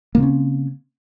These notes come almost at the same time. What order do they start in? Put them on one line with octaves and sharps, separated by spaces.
A#3 C#3 C4 C#4